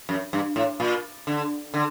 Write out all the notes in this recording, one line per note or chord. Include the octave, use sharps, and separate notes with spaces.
F#2
G2
A2
A#2
D3
D3